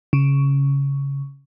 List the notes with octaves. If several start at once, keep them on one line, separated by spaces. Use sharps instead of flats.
C#3